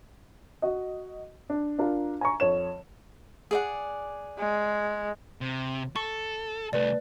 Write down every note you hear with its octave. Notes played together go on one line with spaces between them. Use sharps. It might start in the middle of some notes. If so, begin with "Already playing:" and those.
F#4 D#5
D4
D4 F4 A#4
G#5 A#5 C#6
F2 C#5 E7
G#4 D5 F#5
G#3
C3
A4 C#6
C2 A3 B4 D5